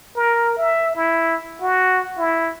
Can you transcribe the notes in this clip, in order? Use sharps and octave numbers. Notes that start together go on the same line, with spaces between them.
A#4
E5
E4
F#4
E4